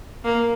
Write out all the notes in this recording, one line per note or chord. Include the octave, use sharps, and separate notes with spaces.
A#3